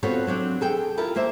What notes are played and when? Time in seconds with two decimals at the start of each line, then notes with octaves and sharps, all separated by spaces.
0.03 B3 C4 F4 F#4 A4 C#5
0.27 F#3 C4 D4
0.61 G#4 A4 G5
0.97 E4 F4 A4 A#4
1.16 A#3 C5 E5